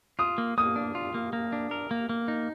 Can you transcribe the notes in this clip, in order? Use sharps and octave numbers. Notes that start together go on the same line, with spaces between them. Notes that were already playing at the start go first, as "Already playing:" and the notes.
F4 D#6
A#3
A#3 D#6
D4
F4
A#3
A#3
D4
A#4
A#3
A#3
D#4